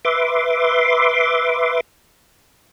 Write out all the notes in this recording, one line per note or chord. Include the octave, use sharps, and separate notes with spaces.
B4 E5 C6 D6